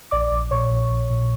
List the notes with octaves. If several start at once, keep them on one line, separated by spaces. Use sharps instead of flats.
A#1 D5 D6
A#1
A#2 C#5 C#6
A#1
A#1
A#2